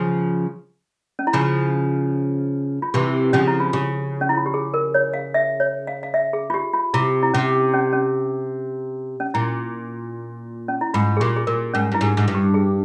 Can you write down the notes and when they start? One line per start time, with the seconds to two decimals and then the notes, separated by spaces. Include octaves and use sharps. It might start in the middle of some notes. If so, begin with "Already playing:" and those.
Already playing: C#3 F3
1.19 C#4
1.27 E4
1.33 C#3 F3 F4
2.82 F4
2.94 C3 E3 G4
3.33 C#3 F3 C#4
3.47 E4
3.60 F4
3.73 C#3 G4
4.21 C#4
4.29 E4
4.37 F4
4.46 G4
4.54 G#4
4.74 A#4
4.94 C#5
5.13 F5
5.34 E5
5.60 C#5
5.87 F5
6.03 F5
6.14 E5
6.33 G#4
6.50 F4
6.54 G4
6.73 F4
6.94 C3 E4
7.23 E4
7.34 C3 C#4
7.74 C#4
7.93 C#4
9.20 C#4
9.34 A#2 E4
10.68 C#4
10.81 E4
10.94 G#2 F4
11.17 G#4
11.20 A#2 G4
11.37 G#4
11.47 A#2 A#4
11.74 G#2 C#4
11.92 G2 E4
12.01 G#2
12.17 G#2
12.28 G2
12.35 G4
12.54 G#4